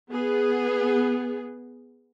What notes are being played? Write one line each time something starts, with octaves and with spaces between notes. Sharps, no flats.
B3 G#4